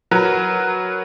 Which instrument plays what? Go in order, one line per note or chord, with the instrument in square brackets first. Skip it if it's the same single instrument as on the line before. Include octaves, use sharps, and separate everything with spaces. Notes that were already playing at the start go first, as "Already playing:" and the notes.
[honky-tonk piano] F#3 F#4 A#4 B4